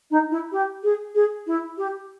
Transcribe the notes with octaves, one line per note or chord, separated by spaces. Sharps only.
D#4
E4
G4
G#4
G#4
E4
G4